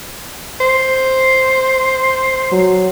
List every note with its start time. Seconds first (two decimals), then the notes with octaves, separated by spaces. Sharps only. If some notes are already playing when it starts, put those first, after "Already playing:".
0.60 C5
2.52 F#3